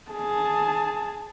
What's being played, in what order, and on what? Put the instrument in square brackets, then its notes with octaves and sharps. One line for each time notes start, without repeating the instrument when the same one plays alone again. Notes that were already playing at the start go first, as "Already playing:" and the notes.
[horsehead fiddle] G#4 A5